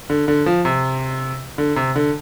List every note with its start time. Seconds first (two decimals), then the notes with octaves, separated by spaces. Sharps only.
0.10 D3
0.28 D3
0.46 F3
0.65 C3
1.58 D3
1.76 C3
1.96 D3